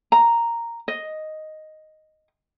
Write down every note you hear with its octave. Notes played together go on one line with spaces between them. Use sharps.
A#5
D#5